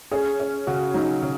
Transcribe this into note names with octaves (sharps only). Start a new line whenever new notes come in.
C#4 G#4
C#4
C#3 F#4
F#3 D#4
C#3